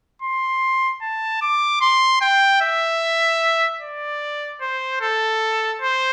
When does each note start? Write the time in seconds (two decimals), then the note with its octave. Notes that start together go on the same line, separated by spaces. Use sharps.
0.22 C6
1.01 A5
1.42 D6
1.81 C6
2.21 G5
2.61 E5
3.81 D5
4.61 C5
5.01 A4
5.82 C5